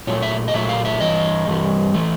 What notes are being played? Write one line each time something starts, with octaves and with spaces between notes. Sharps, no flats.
A#2 F#3 A3 C#5
E5
D#5
A#2 F#3 A3 E5
F5
E5
G2 E3 D#5
G2 E3 G3
E3 A3